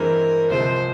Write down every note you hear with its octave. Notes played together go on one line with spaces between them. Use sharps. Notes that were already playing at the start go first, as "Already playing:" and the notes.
Already playing: G2 E3 G#3 C4 A#4
C2 C3 F3 G#3 C5